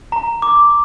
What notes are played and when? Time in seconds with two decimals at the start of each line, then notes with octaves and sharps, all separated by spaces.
0.12 A#5
0.42 D6